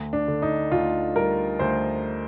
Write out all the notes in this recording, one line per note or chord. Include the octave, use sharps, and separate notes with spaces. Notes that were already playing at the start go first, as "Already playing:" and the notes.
Already playing: D2
D4
D3
D#4
D2 F4
G3 A#4
D2 C5